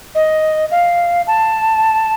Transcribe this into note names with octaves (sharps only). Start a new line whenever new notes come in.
D#5
F5
A5